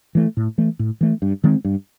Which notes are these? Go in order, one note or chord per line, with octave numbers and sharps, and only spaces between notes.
E3 A3
A2
E3 A3
A2
E3 A3
G2
D#3 G#3 C4
G2